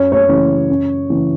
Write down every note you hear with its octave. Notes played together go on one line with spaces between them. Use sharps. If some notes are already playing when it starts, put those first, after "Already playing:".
Already playing: F#2 C#5
C#5
C#3 E3
F#2
C#3 E3